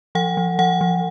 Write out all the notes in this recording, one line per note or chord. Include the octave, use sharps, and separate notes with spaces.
F3 F#5
F3
F3 F#5
F3